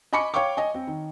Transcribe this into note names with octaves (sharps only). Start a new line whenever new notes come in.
D#5 G#5 B5 C#6 D6 C#7
C#5 F5 G5 C#6 D6
D#5 G#5
C4
D#3